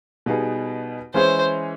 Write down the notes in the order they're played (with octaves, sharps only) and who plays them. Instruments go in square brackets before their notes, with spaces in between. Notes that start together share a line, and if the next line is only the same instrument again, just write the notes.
[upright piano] B2 G3 B3 D#4 G#4
[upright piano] E3 G#3 C#4 E4 G#4 [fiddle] C5